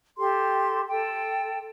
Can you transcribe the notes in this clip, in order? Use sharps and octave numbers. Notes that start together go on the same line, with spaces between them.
G4 A4 C6
A4 G5